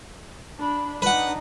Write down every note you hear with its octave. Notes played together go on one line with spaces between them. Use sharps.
D4 B5
D4 D#4 B4 F#5